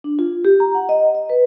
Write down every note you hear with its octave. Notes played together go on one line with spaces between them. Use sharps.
D4
F4
G4
A#5
F#5
D#5
D#5
B4